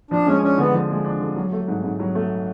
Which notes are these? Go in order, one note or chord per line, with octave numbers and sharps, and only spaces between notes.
F3 D4
G#3 C#4
C#4 D4
D3 B3
F3
G#3
D4
D3
F#3
A3
G#2
G#2
F#3
A3